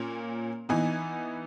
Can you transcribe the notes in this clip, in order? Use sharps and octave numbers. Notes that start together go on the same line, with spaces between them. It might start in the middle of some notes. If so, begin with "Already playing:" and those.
Already playing: A#2 A#3 C#4
E3 B3 D#4 G#5